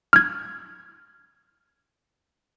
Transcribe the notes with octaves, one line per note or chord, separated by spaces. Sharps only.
F6 G#6